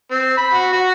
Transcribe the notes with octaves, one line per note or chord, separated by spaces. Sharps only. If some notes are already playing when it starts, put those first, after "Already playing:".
C4
B5
F#4
F#4